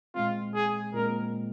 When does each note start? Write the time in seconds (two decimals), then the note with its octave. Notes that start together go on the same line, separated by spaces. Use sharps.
0.15 A#2 G#3 C4 F4
0.55 G#4
0.94 A#2 G#3 C4 A#4